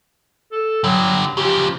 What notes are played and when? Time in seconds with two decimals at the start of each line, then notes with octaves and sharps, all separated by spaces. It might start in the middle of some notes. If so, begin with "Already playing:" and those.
0.52 A4
0.84 D3 F#3 G3
1.37 C#3 F3 G4